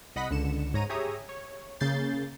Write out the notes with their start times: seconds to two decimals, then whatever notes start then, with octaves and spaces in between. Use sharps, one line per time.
0.16 C2 D#5 F#5 B5 B6
0.31 C#2 D3 C#7 E7
0.74 G#2 C#5 A#5 D#7
0.89 G4 G#4 C#5 E5 A#5 D#6
1.29 C#5
1.80 C#3 A#3 G6 A6 C7